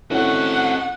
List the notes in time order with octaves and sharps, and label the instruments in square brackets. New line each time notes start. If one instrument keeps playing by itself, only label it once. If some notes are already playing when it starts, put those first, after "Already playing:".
[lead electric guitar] C4 F#4 [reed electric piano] C#4 E4 A4 [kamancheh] F#5